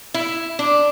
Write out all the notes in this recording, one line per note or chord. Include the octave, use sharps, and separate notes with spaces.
E4
D4